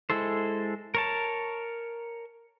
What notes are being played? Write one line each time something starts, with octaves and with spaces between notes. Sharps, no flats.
G#3 E4 A4 C5
A#4 C#5 A5